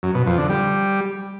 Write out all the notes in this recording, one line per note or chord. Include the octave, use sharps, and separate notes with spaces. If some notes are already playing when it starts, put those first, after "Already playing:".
F#2
B2
F2
D3
G3